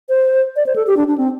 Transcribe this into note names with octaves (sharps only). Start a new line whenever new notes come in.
C5
D5
C5
A4
G4
D4
D4
C4